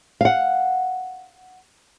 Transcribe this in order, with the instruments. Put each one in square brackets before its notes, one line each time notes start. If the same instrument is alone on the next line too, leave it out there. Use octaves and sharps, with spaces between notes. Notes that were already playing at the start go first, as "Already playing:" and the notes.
[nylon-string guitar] F5 F#5